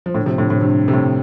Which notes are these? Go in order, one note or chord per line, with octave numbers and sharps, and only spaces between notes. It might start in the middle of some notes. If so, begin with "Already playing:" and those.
F3
A2 D3
C3 F3
A2 D3
A2 D3
G2 C3
C3
A2